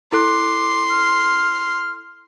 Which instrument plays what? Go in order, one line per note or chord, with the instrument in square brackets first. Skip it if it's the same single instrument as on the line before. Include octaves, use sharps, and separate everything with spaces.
[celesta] E4 A4 F#6 [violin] C6 [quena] D6
[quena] F6